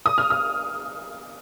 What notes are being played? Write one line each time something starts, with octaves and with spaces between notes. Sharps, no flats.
D#6
F6
D#6